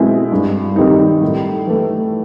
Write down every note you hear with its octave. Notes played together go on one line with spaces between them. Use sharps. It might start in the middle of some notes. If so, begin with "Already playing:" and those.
Already playing: B2 G#3 C4 E4
G2
D#3 G3 C4 D#4
A2
E3 A3